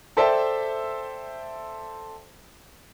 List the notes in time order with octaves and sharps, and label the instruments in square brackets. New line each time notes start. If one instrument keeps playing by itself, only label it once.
[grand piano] A4 C5 D5 E5 G5 A5